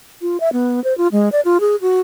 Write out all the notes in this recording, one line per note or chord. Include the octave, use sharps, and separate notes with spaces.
F4
E5
B3
C5
F4
G#3
D5
F4
G#4
F#4